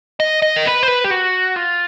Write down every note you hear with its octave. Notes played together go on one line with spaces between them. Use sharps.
D#5
D#5
A#4
B4
C5
B4
G4
F#4
F4